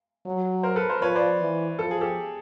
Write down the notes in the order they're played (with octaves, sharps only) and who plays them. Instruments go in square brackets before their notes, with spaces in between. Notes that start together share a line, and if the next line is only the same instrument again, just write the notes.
[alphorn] F#3
[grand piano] A#4 C5
A4 B4
A#4 C5
[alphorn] F3 [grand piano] B4 C#5
[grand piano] C5 D5
[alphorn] E3
[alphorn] F3 [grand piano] A4
[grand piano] G#4
G4 A4